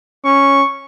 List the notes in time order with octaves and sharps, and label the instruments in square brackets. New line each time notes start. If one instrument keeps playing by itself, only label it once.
[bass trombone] C#4 [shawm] C#6